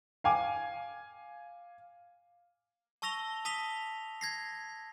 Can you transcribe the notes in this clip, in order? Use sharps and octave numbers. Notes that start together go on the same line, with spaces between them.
F5 G#5 D6
A5 C#6 E6 A#6 F7 G7
A5 D#6 B6 F7 G7
G#6 A#6 C7